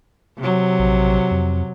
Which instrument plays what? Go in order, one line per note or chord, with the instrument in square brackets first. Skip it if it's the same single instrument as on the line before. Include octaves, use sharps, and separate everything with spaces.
[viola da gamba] C3 F#3
[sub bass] A#1
F2